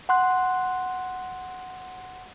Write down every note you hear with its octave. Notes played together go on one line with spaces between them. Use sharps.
F#5 C6 F#6